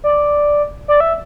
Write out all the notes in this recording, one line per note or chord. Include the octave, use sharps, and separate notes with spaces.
D5
D5
E5